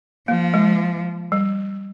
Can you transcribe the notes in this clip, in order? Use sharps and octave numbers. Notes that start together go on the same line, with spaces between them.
F3 A#3
G#3
G3